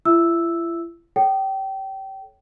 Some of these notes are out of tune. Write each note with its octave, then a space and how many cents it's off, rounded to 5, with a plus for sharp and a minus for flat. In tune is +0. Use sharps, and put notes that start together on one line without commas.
E4 +45 E5 +0 E6 +0
A4 -20 C#5 +5 G5 -25